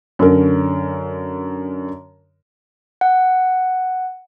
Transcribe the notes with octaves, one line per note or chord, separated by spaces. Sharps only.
F#2 D3 A#4
F#5